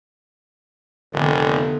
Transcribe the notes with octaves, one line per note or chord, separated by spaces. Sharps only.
F1 D3 D#3 B3